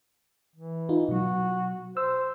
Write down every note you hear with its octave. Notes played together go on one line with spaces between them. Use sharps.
E3
D#4 F4
B2 F#3 F#4
C5 E6